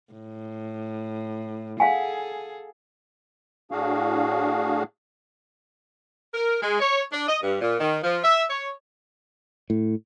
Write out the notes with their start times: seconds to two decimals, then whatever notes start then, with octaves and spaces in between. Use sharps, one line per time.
0.13 A2
1.80 G#4 A4 F5 F#5 G#5
3.71 A2 D4 F#4 G#4 F5
6.34 A#4
6.62 G#3
6.80 C#5
7.12 D4
7.28 D#5
7.43 G2
7.61 A#2
7.80 D#3
8.03 F3
8.24 E5
8.50 C#5
9.70 A2